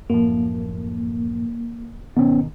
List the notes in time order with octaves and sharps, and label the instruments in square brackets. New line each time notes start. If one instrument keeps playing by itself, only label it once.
[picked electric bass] F#2 A2 F3 [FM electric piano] A#3
[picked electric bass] G#1 B2 D#3 [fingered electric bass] B3 C#4